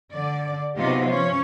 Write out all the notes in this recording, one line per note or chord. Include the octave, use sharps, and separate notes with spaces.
D3 D5
C3 F#3 B3 D#4 F4 G4
F3 C#4 C#5